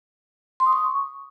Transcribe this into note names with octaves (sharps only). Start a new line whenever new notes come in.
C6
D#6
C#6